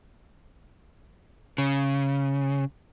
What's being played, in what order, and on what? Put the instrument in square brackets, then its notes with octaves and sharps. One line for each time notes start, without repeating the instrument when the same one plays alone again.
[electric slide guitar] C#3